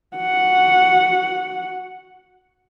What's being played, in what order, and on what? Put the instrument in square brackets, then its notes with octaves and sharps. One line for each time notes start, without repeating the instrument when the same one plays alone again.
[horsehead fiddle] F#4 F#5